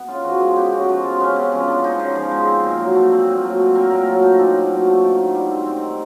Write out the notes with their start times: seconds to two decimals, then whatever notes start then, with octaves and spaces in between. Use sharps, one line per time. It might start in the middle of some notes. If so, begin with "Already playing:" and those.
Already playing: B3
0.08 C#3 F4
0.24 F3 F#4
0.40 G#3 G#4
0.56 B3 G4
0.72 C#3 F#4
0.88 F3 F#4
1.04 G#3 F4
1.20 B3 C#4
1.36 C#3 C4
1.52 F3 C#4
1.68 G#3 D4
1.84 B3 D#4
1.99 C#3
2.15 F3 G#4
2.32 G#3
2.47 C4
2.64 A#2
2.79 F#3
2.95 A3
3.12 C4
3.27 A#2
3.44 F#3
3.59 A3
3.75 C4 A#4
3.91 A#2 A#4
4.07 F#3 A4
4.23 A3 D#4
4.39 C4 D4
4.55 A#2
4.71 F#3
4.87 A3
5.03 D#3
5.19 D#3
5.35 G3
5.51 C4
5.66 D#3 C4
5.82 D#3